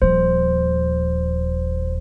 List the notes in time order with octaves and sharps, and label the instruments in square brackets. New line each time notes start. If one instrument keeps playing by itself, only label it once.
[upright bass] D#1 F3 [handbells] C5